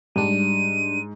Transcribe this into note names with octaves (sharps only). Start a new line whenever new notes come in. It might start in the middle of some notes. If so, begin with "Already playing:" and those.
G#2 G3 D4 D#7